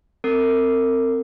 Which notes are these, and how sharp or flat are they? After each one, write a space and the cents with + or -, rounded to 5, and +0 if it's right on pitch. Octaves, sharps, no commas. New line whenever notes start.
C4 +0 A#4 -40